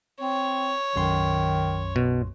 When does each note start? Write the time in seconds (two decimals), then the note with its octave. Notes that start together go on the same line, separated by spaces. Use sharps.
0.21 C4 C#5
0.96 B1 F#2 D#3 C6
1.96 B2